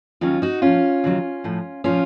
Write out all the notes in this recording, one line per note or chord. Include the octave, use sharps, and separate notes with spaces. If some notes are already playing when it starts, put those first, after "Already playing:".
D#2 D#3 F#3 C#4 F4
D#4 F#4
A#2 F3 C#4 F4
D#2 C#3 F#3
A2 F3
A#2 F3 C#4 F4